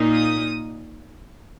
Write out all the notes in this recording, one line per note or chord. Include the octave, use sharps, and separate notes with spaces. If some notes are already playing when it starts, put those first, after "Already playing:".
Already playing: A#2 A#3 D#4
D#6